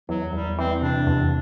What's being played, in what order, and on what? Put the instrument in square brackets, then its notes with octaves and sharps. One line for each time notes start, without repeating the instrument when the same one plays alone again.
[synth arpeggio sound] E2 [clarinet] F#3
[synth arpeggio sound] E2 [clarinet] G3
[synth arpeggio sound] E3 [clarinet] C4
[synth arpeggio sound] C3 [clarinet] D4
[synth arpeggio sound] E2